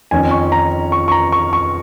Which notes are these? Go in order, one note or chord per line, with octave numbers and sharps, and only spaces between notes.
F2 D#3 C#4 G#5
C#6
A#5
C#6
C#6
A#5
C#6
C#6